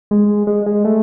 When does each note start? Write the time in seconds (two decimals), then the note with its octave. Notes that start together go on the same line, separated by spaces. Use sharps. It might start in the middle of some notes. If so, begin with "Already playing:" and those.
0.11 G#3
0.47 G#3
0.66 G#3
0.85 A3